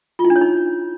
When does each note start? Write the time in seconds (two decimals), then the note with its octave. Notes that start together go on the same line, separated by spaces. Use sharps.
0.19 F4
0.25 E4
0.30 D4
0.36 C#5
0.41 D#4